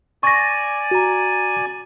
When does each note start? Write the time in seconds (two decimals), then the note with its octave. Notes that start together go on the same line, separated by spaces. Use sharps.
0.23 D5 G#5 C#6 A#6
0.91 F#4 A#5